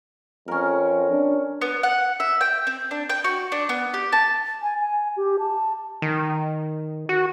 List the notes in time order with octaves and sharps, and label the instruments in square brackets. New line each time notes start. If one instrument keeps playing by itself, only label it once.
[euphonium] F2 [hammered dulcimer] C#4 A#4
[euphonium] D4
[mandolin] B3
F#5
E5
G5
C4
D4
G5
F#4
D4
B3
G4
A5
[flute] G#5
G#5
G4
A5
[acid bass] D#3
F#4